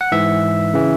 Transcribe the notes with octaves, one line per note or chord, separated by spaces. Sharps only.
F#5
G#2 E3 E5
C#3 E3